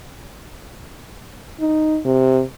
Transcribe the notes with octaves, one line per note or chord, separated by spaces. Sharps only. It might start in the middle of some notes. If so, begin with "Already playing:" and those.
D#4
C3